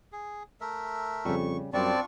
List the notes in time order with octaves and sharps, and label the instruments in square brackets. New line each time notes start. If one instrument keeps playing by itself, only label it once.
[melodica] G#4
A3 A#4 E5
[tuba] F2 [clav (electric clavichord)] C#3 G3 [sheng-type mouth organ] C#6
[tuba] F#2 [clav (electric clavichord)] G3 [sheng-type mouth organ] C4 D5 A5 [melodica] D4 F4 C#6